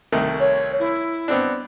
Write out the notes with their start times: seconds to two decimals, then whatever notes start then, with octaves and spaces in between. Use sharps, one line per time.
0.12 C2 D#3 A3
0.39 C#5
0.79 E4
1.28 B3 C4 D4